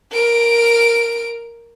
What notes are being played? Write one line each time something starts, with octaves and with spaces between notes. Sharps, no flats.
A#4 D7